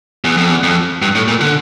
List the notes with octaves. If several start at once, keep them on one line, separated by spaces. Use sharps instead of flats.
E2
F2
E2
F2
G2
A2
A#2
D3